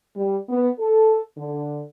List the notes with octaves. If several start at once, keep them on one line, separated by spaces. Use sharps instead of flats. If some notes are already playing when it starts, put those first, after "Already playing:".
G3
B3
A4
D3